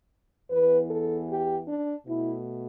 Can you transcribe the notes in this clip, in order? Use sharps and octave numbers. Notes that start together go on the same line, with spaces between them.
E2 E3 B3 B4
A4
G4
D4
B2 A3 E4